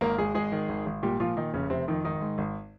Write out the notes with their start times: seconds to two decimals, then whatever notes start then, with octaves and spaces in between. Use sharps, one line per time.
0.01 G#1 A#3 A#4
0.18 G#1 G#3 G#4
0.35 G#1 G#3 G#4
0.52 D#3
0.69 G#1
0.86 G#1
1.03 A#2 G3 G4
1.20 A#2 F3 F4
1.36 A#2 D#3 D#4
1.53 F1 C#3 C#4
1.70 F1 C3 C4
1.88 F2 D#3 D#4
2.04 G#1 D#3 D#4
2.21 G#2
2.38 G#1